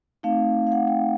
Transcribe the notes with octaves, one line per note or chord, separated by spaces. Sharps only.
A3 C4 D#4 F5
F5
F#5
G5